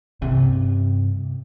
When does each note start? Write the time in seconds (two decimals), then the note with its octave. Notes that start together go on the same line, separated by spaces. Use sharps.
0.22 G2 C3